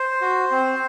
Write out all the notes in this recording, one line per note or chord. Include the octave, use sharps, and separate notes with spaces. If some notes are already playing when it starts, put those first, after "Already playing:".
Already playing: C5
F#4
C4